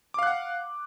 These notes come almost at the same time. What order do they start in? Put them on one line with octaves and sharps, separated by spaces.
D6 F5 F#6 F#5